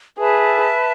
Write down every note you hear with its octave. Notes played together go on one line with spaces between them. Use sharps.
G#4 B4 E5 A5